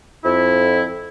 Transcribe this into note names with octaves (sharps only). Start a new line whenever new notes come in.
F2 E4